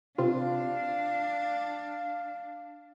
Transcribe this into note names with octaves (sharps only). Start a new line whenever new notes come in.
C3 C4 D4 F4 F5